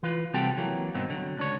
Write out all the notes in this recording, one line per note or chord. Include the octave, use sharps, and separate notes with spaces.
E3 F4 B4
C3 G3 C4 F#4 A4 G5
E3 F#3 A#3
G2 B2 D#3 C4
D3 F#3
C#2 D4 C#5